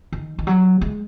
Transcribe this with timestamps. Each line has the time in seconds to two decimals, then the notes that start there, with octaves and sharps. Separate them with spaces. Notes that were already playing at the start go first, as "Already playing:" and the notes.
0.12 D#3
0.39 D#3
0.47 F#3
0.81 G#3